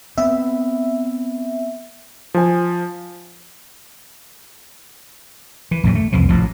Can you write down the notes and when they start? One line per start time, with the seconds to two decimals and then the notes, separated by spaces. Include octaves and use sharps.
0.18 B3 C4 E5
2.34 F3 G#5
5.71 E3
5.84 A#1 F#2 A#2 F#3
5.95 A3
6.12 C2 F2 E3 F3
6.29 A1 F3